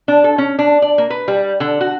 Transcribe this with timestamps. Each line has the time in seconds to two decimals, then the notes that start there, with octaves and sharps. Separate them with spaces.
0.08 D4
0.24 A4
0.38 C#4
0.59 D4
0.82 D5
0.98 A#3
1.10 B4
1.28 G3
1.60 D3
1.81 F#4